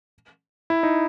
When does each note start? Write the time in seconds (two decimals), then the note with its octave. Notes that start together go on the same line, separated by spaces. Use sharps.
0.70 E4
0.83 D#4